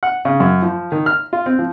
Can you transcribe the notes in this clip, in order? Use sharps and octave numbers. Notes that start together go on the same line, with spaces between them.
F#5
C#3
F#2
F3
D#3
F6
F4
C4
F3